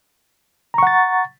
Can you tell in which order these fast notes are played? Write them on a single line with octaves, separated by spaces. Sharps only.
A#5 C#6 F#5 A6